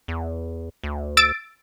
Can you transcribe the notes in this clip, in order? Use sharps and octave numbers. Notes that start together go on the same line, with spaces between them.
E2
D2
E6 A6 D7